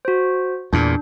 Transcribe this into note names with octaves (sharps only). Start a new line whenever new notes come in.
F#4 C5
E2 A#2 D4